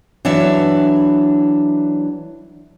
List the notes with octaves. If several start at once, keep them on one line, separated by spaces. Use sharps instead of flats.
E3 F#3 D4 C#5 E5